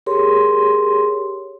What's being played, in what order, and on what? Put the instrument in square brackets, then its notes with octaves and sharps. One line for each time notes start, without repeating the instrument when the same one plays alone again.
[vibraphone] G4 G#4 A#4 C#5 C6